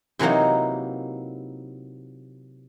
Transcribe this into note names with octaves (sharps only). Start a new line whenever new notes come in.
C3 E3 F#3 A#3 D#4